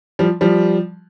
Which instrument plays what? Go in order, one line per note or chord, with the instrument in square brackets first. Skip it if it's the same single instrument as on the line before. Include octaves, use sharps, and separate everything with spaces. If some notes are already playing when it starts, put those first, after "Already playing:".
[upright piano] F3 G3
F3 G3